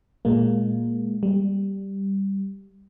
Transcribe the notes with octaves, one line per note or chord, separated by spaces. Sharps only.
A#2 G#3 A#3
G3